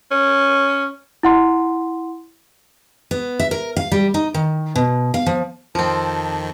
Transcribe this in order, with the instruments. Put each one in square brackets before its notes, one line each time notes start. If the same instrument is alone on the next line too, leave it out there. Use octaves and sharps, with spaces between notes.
[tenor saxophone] C#4
[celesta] E4 F#5 C6
[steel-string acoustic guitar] B3
E5
A#4
F5
G3
D#4
D#3
B2
F5
F3
[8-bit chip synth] F2 D#3 [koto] F3 C4 [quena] A5